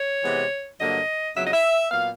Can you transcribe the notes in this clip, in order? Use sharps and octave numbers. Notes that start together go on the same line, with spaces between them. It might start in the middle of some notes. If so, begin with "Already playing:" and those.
Already playing: C#5
C3 E3 G#3 B3
G2 D3 F#3 A#3 D#5
F2 C#3 F#3 B3 E5
D#5
E5
A#2 F#3 B3 F5